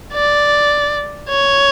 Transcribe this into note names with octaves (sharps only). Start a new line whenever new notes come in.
D5
C#5